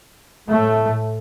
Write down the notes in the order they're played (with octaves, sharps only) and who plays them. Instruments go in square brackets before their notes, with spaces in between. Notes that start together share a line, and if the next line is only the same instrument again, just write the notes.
[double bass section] A2 A3